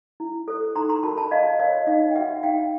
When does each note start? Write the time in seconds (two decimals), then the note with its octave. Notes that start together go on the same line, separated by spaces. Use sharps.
0.20 E4
0.48 A4 C5
0.75 D#4 A#5 C6
0.89 A#5 C6
1.03 F#4 A#4 A5 B5
1.17 A5 B5
1.31 F4 D#5 F5
1.59 A#4 C#5 D#5 F5
1.87 D#4 D#5 F5
2.11 G5
2.15 F#4 B4 E5 F#5
2.43 D#4 F5 G5